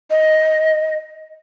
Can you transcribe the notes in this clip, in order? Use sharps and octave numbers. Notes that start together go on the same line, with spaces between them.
D#5